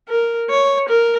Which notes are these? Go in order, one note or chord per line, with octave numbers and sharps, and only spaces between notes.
A#4
C#5
A#4